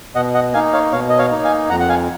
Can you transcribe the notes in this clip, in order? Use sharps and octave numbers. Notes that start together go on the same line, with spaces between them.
B2 D#5 F#5
D#5 F#5
A#3 D#4 F5 G#5
C#5 F5
B2 C#5 F5
D#5
C#5 F5
A#3 D#4
F5 G#5
F2 F#5 A#5
F#5
F5 G#5